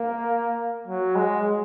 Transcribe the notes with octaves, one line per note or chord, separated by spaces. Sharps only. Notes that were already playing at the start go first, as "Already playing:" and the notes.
Already playing: A#3
F#3
G#3